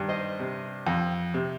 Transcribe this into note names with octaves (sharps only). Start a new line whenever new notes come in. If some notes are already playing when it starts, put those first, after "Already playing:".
Already playing: G2 D#3
C5 D#5
C3
F2
C3